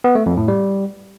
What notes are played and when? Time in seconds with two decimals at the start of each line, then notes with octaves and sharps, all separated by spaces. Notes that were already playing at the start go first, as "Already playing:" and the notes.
0.04 B3
0.15 A3
0.26 F2
0.37 A2
0.48 G3